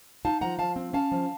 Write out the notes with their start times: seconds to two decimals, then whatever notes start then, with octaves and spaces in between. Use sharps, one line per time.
0.25 D#4 F5 A5
0.41 F3 F#5 A#5
0.59 F3 F5 A5
0.76 C4
0.93 C#4 F5 A5
1.12 F3